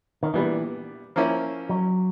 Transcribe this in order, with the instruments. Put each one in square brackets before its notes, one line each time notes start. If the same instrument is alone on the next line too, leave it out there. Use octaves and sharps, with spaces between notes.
[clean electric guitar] D#3
[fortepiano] A#2 G3 B3 D4 [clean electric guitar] E3
[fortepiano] F3 A#3 C#4 E4
[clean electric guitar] F#3